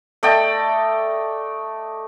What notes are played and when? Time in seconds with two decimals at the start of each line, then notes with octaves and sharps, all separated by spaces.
0.23 A3 D5 D#5 G5